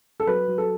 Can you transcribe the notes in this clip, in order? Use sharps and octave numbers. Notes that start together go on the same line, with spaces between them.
A4
F#3 B4
F#3
A4